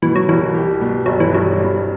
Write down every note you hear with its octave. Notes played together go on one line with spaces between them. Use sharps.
B2 E3
F#3
C2 E3
G4
B2
G1 F#3
E3
G2 F#3
C3